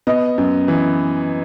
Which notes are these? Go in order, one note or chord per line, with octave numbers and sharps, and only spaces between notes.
B3 D#5
F#2
E3